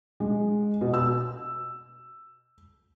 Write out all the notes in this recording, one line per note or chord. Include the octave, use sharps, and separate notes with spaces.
G#3
B2
E6